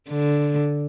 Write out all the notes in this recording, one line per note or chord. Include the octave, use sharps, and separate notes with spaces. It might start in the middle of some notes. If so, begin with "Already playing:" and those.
D3